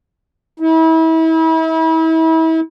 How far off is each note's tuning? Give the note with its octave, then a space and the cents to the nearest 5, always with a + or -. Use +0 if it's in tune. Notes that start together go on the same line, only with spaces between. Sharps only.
E4 -35